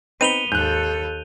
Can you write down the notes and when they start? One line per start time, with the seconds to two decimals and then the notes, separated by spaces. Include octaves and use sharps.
0.21 B3 C4 D#4 B4 D#7 F7 G7
0.52 D#2 G#2 A4 F#6 G6